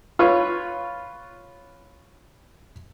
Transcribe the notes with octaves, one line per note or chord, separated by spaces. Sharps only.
F4 B4 C#5